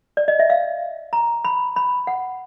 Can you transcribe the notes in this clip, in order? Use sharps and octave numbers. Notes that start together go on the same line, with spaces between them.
D5
D#5
E5
F5
A#5
B5
B5
F#5